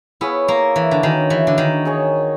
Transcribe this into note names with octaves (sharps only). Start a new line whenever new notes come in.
B3 E4 G#4 C#5 F5
A#3
E3
D3
D#3 C#4 F#4 A#4
E3
D3
D#3
D#4 G#4 C#5